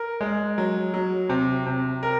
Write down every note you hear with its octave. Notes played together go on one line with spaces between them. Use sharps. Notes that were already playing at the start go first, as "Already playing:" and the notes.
Already playing: A#4
G#3
F#3
F#3
C3
C3
A#4